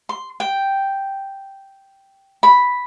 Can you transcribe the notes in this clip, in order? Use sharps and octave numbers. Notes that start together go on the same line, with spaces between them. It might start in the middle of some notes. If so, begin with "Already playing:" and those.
C6
G5
B5